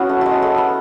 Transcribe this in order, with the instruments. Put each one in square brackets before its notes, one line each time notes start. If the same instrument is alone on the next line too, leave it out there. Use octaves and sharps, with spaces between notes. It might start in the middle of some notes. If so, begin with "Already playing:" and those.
Already playing: [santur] B3 C#4 E4 F#4
A3
G#3 A3
A3
B3